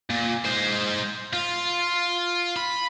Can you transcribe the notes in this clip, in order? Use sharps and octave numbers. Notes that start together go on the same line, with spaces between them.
A#2
G#3 C5
F4
B5